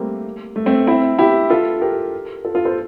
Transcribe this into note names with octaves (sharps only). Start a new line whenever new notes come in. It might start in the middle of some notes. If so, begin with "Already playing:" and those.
Already playing: G3 A3 A#3 C4
A3
A3 C4
C4 E4
E4 G4
F4 A4
G4 A#4
F4 A4
F4 A4
A4 C5